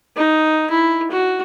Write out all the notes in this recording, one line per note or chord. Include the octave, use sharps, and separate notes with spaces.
D#4
E4
F#4